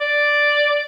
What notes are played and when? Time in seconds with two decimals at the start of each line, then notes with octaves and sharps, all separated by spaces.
0.01 D5